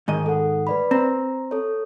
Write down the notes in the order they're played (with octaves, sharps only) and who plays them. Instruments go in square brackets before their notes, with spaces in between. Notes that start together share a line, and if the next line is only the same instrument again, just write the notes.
[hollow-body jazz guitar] G#2 D#3 D#5
[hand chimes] A4 F#5
B4 D5 B5
[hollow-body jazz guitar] C4 [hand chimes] A#5
[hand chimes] A4 C#5